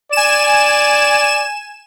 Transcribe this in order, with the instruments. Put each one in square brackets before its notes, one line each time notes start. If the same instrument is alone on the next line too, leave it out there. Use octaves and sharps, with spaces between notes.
[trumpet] D5 [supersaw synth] G#5 E7